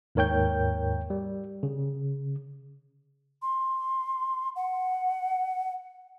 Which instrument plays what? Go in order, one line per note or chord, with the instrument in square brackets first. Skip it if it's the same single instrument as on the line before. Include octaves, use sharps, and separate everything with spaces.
[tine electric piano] D#2 G#2 A#4 C#5 G5 G6
G3
C#3
[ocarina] C6
F#5